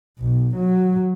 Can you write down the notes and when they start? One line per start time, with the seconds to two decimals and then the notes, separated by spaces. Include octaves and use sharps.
0.19 B1
0.56 F#3